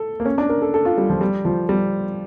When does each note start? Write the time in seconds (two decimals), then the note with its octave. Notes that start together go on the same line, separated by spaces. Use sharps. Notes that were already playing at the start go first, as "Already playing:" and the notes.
Already playing: A4
0.20 A#3
0.25 C#4
0.38 D4
0.49 A#4
0.62 A4
0.74 A4
0.85 F4
0.98 G3
1.10 F3
1.21 G3
1.45 F3
1.69 G3